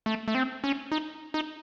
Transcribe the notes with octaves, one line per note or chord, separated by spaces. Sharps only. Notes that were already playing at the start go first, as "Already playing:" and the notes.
A3
A3
C4
C#4
D#4
D#4